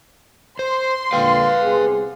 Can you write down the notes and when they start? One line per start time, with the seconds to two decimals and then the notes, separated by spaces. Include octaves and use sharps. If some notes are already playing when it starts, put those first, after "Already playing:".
0.59 C5 C6
1.13 A#2 D3 B4 F5 G5
1.62 C2 B3 G#4